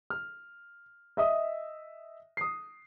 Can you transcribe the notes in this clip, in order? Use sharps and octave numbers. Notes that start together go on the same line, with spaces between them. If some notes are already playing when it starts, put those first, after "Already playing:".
F6
D#5 E5 D#6
D#6 C7